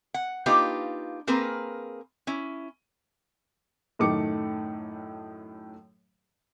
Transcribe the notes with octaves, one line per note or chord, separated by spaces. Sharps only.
F#5
A#3 D4 D#4 F4 G4 B4
A#3 C4 G#4 A#4 B4
C#4 E4
F#2 A2 D#3 A3 D6 C#7